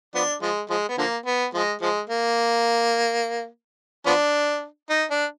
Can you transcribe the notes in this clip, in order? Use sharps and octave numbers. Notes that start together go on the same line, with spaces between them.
F3 B3 D4
F3 G#3
F3 G#3
B3
D3 F3 A#3
B3
F3 G#3
F3 G#3
A#3
F3 B3 D4
D#4
D4